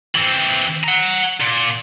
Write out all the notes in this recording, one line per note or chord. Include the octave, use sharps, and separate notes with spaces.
E3 C4
F#5 A#5
A#2